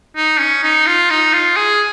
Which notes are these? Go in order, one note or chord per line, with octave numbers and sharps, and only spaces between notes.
D#4
C#4
D#4
F4
D#4
F4
G#4